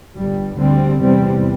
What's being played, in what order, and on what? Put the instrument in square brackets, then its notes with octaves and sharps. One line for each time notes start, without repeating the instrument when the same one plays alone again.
[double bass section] G1 G2 G3
D2 D3 G3 C4
E2 C3 G3 C4